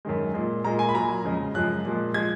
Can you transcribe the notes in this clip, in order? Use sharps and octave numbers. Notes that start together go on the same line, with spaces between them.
F#2 D#3 G#3
A#2 G#3
A#2 G#3 A#5
G#5
B5
A#2 F#3 A#5
F2 C#3 G#3
F#2 F3 G#3 F#6
A#2 F3 G#3
F3 G#3 G#6